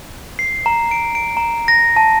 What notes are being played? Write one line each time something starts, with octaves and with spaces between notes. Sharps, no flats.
C7
A#5
D7
D7
A#5
A#6
A5